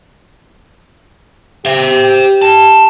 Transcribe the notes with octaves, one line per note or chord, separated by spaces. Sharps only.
G4 C5 E5
A5